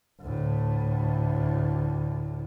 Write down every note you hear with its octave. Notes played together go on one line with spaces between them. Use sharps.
D2 A2